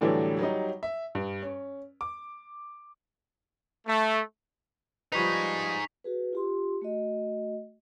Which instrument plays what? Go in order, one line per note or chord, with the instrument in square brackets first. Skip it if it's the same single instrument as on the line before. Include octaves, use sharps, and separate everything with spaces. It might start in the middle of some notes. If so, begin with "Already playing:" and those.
[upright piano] A2 D3 E3 F#3 G3 D4
F#3 G3 D#4
E5
G2
C#4
D6
[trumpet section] A3
[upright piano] F3 G3 B4 [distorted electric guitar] D#4 G#4 [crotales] C#6 B6 F7
[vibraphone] F#4 G#4 B4
F4 G4 C6
A3 F#4 D#5